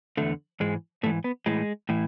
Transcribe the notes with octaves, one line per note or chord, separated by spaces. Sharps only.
E2 D3 A3
G#2 E3 G#3
G#2 E3 A3
B3
A2 E3 G#3
A2 E3